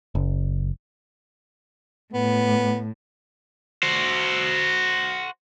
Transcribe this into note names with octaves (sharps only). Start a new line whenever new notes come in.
F#1
A2 B3
F#4 C5